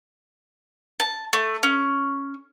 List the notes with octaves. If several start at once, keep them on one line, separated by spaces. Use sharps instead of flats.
A5
A3
C#4